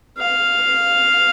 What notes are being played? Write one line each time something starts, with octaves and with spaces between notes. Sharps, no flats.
F5